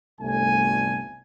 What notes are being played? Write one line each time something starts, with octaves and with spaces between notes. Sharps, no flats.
G1 C2 A3 G#5